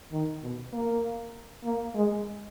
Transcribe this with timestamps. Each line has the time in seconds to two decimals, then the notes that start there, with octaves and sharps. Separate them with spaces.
0.12 D#3
0.42 B2
0.73 A#3
1.64 A#3
1.95 G#3